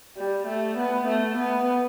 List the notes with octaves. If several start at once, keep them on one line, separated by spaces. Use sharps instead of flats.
G3
A3
B3
A3
B3